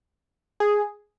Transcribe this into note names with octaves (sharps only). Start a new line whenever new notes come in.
G#4